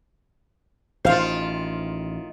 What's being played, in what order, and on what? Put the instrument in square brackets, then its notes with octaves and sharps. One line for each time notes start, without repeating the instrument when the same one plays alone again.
[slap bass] A1 [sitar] D#3 F4 [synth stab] C5 F5